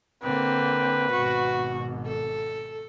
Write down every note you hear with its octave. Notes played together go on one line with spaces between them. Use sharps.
D3 A#3 C4 B4
G#1 B2 F#4
A4